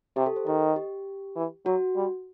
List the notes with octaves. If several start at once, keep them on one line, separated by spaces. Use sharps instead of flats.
C3 G4
A4
C5
D#3 D#5
G4
E3
F#3 F#4
G3